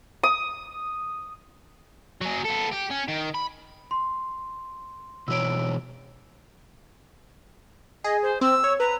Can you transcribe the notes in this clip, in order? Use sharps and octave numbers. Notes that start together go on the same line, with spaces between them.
D#6
F#3 G#4
B3 A4
G4
C#4
D#3
B5
C6
B2 E3 C#5 E6 D7
G#4 D#5
C5
C4 E6
C#5
B4 A#5